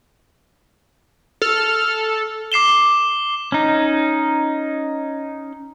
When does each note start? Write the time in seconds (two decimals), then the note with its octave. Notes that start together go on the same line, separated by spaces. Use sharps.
1.42 A4 F6
2.52 D6 C7 E7 G7
3.52 C#4 D#4